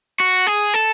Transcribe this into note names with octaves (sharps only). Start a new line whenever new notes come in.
F#4
G#4
A4